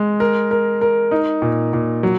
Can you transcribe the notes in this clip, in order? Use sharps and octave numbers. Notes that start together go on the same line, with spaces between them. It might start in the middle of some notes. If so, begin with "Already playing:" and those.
Already playing: G#3
A#4
A#4
A#4
D#4
A#2
A#2
F#3